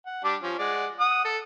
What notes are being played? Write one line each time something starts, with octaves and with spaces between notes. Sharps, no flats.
F#5
G3 D4 D6
F3 C#4
G#3 D5 F#5
F#5 D#6
A4